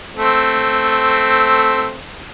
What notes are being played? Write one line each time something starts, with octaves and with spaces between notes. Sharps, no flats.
A3 C4